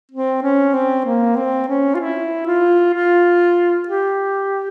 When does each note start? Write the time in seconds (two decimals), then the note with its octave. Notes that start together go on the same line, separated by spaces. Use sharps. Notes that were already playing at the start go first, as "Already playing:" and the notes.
0.11 C4
0.42 C#4
0.74 C4
1.06 A#3
1.36 C4
1.68 C#4
1.95 F4
2.00 E4
2.47 F4
2.94 F4
3.89 G4